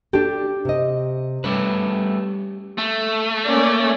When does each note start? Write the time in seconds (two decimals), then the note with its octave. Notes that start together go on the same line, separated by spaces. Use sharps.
0.13 D4 G4 A4
0.65 C3 D#5
1.44 G3 A3 C#4 B4
2.78 A3
3.46 A#3 C#4 D5